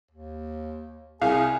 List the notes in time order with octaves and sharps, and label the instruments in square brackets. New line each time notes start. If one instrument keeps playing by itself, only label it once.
[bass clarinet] D#2
[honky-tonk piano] C2 [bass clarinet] G#4 [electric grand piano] F5 [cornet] G#5